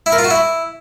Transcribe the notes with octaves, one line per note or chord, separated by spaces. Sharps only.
E4
A#4
F4
F#4
E4